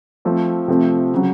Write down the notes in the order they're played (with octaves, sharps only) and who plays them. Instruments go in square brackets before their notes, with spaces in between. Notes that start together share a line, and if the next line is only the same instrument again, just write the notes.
[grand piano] F3 A3 C4
C3 F3 A3 C4
C#3 F#3